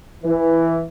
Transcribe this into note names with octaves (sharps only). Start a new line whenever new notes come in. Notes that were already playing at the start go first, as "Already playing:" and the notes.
E3